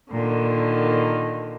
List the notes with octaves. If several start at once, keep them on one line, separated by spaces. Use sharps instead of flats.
A#2 D3 D#3